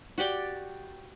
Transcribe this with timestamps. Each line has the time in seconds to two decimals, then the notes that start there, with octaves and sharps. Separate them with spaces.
0.18 F#4 G4 D5 G5